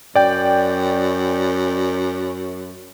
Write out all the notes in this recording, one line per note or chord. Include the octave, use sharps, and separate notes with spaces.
F#2 D5 G5